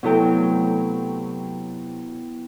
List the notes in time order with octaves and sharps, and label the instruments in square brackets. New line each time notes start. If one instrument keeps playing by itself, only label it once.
[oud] C3 F#3 A3 [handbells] B3 E4 G5